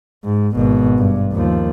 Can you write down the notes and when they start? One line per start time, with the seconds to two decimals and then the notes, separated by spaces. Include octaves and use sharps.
0.25 G#2
0.55 G#1 B2
0.98 G2
1.33 D#2 F3